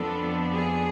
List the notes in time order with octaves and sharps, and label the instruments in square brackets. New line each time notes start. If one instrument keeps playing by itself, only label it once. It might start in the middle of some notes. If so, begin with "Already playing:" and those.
Already playing: [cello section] F2 F3 B3 D4 A4
G#4